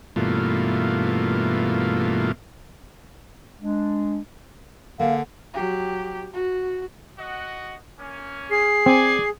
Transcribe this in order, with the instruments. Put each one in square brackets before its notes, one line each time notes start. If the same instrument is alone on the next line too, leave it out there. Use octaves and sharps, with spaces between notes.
[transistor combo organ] G2 B2 E3 A3 A#3 F4
[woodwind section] G#3 D4
[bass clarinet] D3 [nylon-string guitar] A#3 G#4 [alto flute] F5
[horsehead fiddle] F#3 G4
F#4
[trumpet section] F#4 D#5 F#5
A#3 C#4
[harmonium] G#4 [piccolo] C7
[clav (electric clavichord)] C4 [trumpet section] D5 G#5